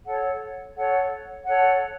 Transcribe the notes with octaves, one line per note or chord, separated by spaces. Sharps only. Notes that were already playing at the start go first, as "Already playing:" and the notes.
A4 C#5 F#5
A4 C#5 F#5
A4 C#5 F#5